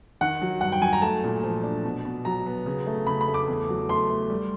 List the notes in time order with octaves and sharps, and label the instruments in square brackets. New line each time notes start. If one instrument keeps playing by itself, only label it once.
[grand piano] D#3 F#5
F#3
G2 F#5
G5
F#3 G#5
A#5
A3 A5
A#2
F3
D4
B2
B2
F#3 A#5
B3
C#3
A3
C#3 B5
B5
A3
D6
E2
F#3
A3 C6
A3
G3